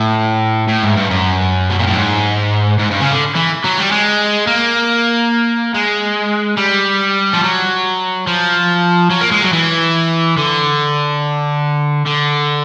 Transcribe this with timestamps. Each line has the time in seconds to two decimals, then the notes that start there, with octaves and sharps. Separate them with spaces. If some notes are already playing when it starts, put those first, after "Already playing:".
Already playing: A2
0.68 A2
0.83 G#2
0.97 G2
1.11 F#2
1.70 B2
1.79 A#2
1.87 A2
1.95 G#2
2.79 G#2
2.90 G2
3.00 C#3
3.11 D3
3.35 E3
3.64 F#3
3.78 G3
3.92 G#3
4.47 A#3
5.74 G#3
6.58 G3
7.33 F3
7.43 F#3
8.27 F3
9.10 F#3
9.21 A#3
9.32 G#3
9.42 F#3
9.53 E3
10.38 D3
12.06 D3